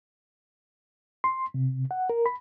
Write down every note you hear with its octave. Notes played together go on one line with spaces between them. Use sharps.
C6
C3
F#5
A#4
B5